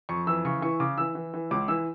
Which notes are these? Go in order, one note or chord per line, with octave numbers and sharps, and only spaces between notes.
F2 C#6
E3 E6
C#3 C#6
E3 C#6
C#3 D6
E3 E6
E3
E3
C#2 D6
E3 E6